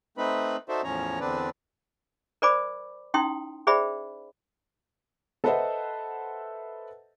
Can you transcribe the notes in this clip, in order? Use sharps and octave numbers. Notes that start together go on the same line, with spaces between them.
A3 C4 D#4 B4 B5
D#4 F#4 A4 C5 D5 E5
E2 A2 F3 C#4 C#5 A#5
E2 D3 C4 D4 B4 D5
A#4 C5 D5 G#5 B5 D6
C#4 D#4 E4 G5 C6 D#6
G#4 C5 D5 E5 G5 B5
A4 B4 C5 D#5 E5 F#5